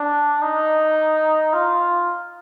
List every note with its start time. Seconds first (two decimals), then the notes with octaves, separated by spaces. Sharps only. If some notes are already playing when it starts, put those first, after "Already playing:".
Already playing: D4
0.42 D#4
1.53 F4